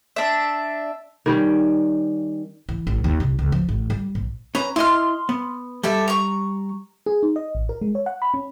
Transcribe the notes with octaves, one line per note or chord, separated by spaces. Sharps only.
D4 E5
D#3 G3 C#4
E3
A1
D#2
C2
C#2
F3
A1
G3
A#1
C#4 B4 A#5
E4 D#5 C6 F6
B3
G3 G4 A4 E5
A#5 C#6
G#4
D#4
D#5
A1
A#4
G#3
C#5
F#5
B5
C#4